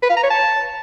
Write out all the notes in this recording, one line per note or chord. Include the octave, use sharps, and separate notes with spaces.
B4
F5
A#5
C#5
A5